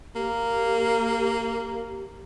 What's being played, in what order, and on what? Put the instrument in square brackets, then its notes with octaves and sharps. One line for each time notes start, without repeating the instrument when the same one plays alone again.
[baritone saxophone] A#3 [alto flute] G4